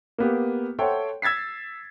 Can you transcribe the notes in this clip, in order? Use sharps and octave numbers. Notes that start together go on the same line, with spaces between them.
A#3 B3 G4
A4 C5 C#5 E5 F#5 G5
E6 G#6 A6 B6 C7